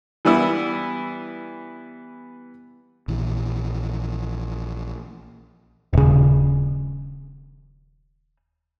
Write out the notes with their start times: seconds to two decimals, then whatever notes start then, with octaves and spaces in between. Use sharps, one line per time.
0.25 E3 G3 B3 E4 E6
3.08 A#1 E3
5.93 D#1 C#3